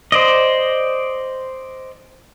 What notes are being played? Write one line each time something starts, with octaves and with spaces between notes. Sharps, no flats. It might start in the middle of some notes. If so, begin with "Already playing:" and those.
C5 D5 D#5